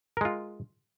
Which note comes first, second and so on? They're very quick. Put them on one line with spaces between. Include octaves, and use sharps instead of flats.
A#4 G#3 F4